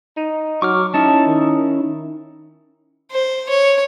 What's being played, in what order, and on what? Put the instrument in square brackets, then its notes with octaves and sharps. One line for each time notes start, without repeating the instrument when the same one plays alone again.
[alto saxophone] D#4
[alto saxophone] F#3 [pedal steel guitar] C#6 D6 F6
[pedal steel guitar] C#4 D#4 E4 [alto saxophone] A5
[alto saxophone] D#3
[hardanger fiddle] C5
C#5